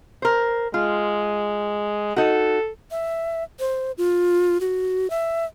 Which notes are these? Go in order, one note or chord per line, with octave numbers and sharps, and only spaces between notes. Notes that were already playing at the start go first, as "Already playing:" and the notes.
A#4 C5
G#3 F4
D#4 F#4 A4
E5
C5
F4
F#4
E5